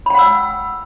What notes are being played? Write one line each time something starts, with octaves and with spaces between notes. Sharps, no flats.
F#5 G5 B5 E6